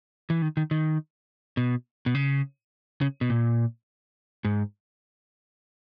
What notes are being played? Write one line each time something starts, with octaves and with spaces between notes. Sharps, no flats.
E3
D#3
D#3
D#3
B2
B2
C#3
C#3
B2
A#2
G#2